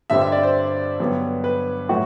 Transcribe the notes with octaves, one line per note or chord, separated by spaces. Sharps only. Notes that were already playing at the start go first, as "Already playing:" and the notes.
G2 D3 G3 C4 E5
E5
D5
C5
G2 D3 F#3 B3
B4
A2 F#3 A3 F#4